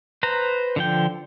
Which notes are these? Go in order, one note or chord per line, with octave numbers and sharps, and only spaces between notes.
B4 C5 A#5
D3 F3 G5